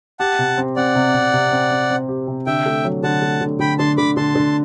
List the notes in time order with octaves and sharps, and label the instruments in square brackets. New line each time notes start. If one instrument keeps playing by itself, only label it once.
[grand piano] G4 [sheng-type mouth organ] F#5 A5
[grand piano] C3
C4
[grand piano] C4 [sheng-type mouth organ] D5 F#5
[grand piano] C3
C3
C3
C4
C4
C4
G4
C3
[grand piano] D3 [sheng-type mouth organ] E5 G5
[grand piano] A3
F#3
[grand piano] D3 [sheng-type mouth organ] F#5 A5
[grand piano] A3
D3
[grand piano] D3 [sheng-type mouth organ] G5 B5
[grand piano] D3 [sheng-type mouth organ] A5 C6
[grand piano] D3 [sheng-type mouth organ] B5 D6
[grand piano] D3 [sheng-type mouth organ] A5 C6
[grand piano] D3